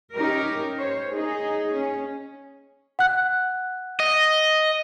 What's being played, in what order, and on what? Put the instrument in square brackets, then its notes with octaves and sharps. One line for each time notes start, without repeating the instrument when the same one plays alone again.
[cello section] C#4 D#4 G4 A#4
C5 C#5
D#4 G#4
C#4
[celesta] F#5 F#6
[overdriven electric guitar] D#5